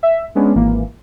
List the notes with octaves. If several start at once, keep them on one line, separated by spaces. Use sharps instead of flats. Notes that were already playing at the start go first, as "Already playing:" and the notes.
E5
G#3 B3 C#4 D4
G#1 E3 A#3